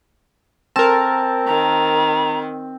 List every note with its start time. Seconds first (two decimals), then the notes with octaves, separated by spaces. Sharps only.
0.76 C4 A#4 A5
1.47 D#3 A#5